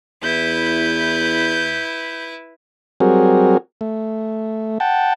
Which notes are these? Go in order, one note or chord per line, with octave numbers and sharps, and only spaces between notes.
E2 E4 B4 G6
F#3 G3 C4 F#4 G#4 A#4
A3
F#5 G5 A5